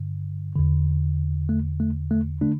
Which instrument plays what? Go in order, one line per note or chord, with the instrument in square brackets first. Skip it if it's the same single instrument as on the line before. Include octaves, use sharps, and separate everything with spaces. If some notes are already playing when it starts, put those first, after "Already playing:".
Already playing: [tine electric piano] G2 D3
E2 D3
A3
A3
A3
D3 A3 D4